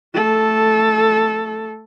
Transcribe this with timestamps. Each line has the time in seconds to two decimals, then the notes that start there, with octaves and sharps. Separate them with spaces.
0.14 A3 A4